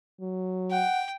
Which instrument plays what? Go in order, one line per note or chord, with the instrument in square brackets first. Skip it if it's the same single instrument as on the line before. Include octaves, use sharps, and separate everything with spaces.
[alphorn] F#3
[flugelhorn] F#5 [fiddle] G5